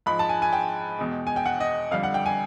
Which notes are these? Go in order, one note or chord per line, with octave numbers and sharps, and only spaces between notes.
G#2 F3 G#3 B5
A5
G#5
G#5
G5
E2 B2 G#3
G#5
G5
F#5
D#5
F2 D3 G3 F5
F#5
G5
G#5